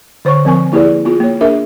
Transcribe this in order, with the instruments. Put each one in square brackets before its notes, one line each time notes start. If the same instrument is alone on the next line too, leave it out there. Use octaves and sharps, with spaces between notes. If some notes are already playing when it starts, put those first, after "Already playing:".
[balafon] D3 C5 C#5 C#6
F3 C4 A#4 G#5 C#6
A#3 E4 G4 G#4 B4 D5
B3 F4 G#4
A#3 C#5
D4 G#4 A#4 E5